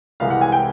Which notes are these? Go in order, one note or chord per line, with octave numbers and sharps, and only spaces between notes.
C2 C3 E3 G#3 F5
F#5
G#5
G5